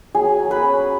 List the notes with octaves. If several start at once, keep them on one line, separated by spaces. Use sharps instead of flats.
F#3 G#4 G#5
F#3
B4 B5
C#4